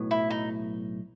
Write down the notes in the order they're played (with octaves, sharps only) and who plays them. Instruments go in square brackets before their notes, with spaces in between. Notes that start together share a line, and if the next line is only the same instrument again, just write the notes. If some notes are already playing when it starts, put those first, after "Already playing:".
Already playing: [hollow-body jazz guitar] B1 A2 F#3 B3
[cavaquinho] E4
D#4